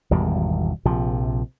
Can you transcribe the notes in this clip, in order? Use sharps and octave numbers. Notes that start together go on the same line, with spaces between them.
G#1 E2 B2 G3
A#1 C3 F3